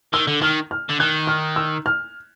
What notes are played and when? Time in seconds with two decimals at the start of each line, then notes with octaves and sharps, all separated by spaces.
0.13 D#3 E6
0.27 D3
0.41 D#3 F6
0.71 F6
0.89 D3
1.00 D#3 F#6
1.27 F6
1.56 E6
1.86 F6